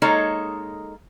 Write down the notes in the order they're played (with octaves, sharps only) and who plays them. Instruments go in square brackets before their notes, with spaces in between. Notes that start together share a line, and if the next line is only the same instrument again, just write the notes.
[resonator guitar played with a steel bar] G#3 A#3 D#4 A4 C#5 A#5